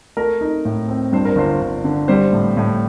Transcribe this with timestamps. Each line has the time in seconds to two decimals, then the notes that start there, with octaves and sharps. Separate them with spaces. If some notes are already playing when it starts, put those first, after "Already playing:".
0.17 A3 A#4
0.41 D#4
0.65 A2
0.88 C4
1.13 G2 C5
1.25 A#4
1.36 G1 C5
1.61 G1
1.84 D3
2.08 G3 C5
2.33 A2
2.57 A2